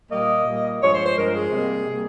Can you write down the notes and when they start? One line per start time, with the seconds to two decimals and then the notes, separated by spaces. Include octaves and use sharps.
0.10 A#2 G3 A#3 D#5
0.45 A#2 G3 A#3
0.80 G2 F3 G#3 C#5
0.93 C5
1.04 C5
1.15 G2 F3 G#3 A#4
1.34 G#4
1.51 C3 G3 A#3
1.86 C3 G3 A#3